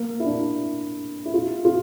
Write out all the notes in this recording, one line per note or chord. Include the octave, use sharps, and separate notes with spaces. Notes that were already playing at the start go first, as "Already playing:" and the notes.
Already playing: A#3
E4
D4
E4
F4
F4